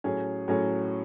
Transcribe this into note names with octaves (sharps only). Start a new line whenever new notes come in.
A2 F#3 C#4 G#4
A2 F#3 C#4 G#4